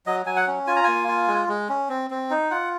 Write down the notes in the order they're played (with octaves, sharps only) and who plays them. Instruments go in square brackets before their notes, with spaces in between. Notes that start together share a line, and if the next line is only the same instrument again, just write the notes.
[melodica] F#3 D#5
F#3 G#5
F#5
C#4
F4 G#5
A#5
A#3 G#5
F4
G#3
G#3
C#4
C4
C4
D#4
F4 F#5